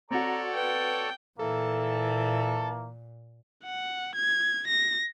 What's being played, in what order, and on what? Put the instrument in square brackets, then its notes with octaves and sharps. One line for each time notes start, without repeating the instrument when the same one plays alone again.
[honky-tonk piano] C4 F#4 [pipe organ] A4 C#5 D5 [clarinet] A#5
[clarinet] B4 [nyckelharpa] G5
[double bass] A#2 [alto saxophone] E3 [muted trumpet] A#3 [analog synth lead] A4
[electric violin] F#5
G#6
A#6